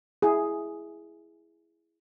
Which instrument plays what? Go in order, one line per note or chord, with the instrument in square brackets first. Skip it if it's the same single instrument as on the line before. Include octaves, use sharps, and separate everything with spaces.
[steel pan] E4 G#4